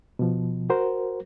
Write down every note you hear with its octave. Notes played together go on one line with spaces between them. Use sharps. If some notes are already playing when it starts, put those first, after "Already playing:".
B2 F3
F#4 A#4 C5